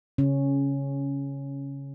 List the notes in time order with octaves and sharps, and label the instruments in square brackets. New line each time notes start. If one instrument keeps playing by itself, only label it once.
[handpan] C#3 C#4